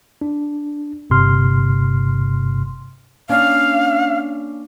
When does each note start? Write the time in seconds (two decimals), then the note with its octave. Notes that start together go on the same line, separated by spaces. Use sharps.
0.21 D4
1.10 G1 G2 C3 C6 F6
3.29 A#3 C#4 D4 F5